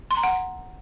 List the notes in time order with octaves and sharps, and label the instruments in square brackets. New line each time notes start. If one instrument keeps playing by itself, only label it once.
[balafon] C6
A#5
F#5